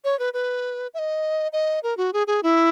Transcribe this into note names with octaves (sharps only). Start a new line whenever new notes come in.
C#5
B4
B4
E5
D#5
D#5
A#4
F#4
G#4
G#4
E4